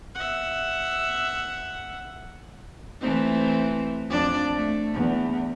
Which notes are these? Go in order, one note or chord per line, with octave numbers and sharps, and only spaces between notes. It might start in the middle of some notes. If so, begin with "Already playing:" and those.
E5 F#5
E3 A3 C4
F2 D4 D5
A3
E2